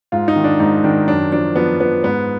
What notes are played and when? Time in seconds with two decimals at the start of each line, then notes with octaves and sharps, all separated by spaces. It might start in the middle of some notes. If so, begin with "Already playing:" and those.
0.12 G#2 F4
0.28 D#4
0.36 D#3
0.44 D4
0.60 G#2 D#4
0.84 D#3 D4
1.08 F#2 D4
1.32 F3 D4
1.56 F3 B3
1.80 F3 B3
2.04 G#2 B3